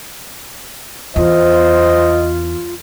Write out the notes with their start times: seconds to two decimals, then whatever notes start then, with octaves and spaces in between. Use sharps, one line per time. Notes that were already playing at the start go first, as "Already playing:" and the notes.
1.16 E2 F4 C5 D#5